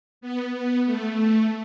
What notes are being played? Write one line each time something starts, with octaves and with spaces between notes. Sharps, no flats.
B3
B3
A3
A3